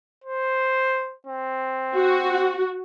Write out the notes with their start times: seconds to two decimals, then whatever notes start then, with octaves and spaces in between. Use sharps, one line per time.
0.24 C5
1.27 C4
1.94 F#4